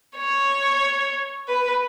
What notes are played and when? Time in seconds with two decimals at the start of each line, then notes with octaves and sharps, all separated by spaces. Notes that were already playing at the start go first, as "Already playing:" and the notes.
0.18 C#5
1.48 B4